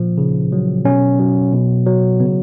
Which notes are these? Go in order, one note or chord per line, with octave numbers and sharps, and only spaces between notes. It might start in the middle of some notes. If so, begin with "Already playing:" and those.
Already playing: A#2 F3
C#3
F#3
B2 C#4
F#3
B2
F#3
C#3 B3